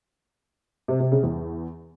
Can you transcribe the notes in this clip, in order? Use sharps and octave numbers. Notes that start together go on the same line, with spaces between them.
C3
C3
C#3
E2